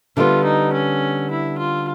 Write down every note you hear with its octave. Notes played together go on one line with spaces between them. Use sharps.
D3 G3 B3 F4
D#4
C#4
E4
F4